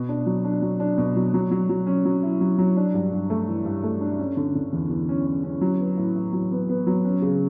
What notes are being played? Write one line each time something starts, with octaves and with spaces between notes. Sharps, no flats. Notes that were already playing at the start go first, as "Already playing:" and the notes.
Already playing: B2
D4
F#3
D4
F#3
D4
B2
F#3
F#3
F#3
F#3
C#4
F#3
E4
F#3
F#3
D4
G2
G2
A3
E3
G2
A3
D4
C#4
D3
D3
E2
E2
C#4
C#4
C#4
F#3
B3
A2
A2
F#3
B3
B3
F#3
C#4
C#3